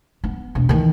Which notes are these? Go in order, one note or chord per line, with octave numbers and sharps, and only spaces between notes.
B3
E1
D#3 E3